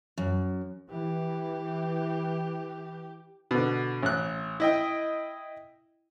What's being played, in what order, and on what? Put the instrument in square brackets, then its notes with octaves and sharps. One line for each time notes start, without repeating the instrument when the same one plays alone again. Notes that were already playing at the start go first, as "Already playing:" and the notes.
[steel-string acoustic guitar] F#2
[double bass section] E3 [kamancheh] G4
[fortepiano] B2 D3
A1 F#6
E4 D#5 G5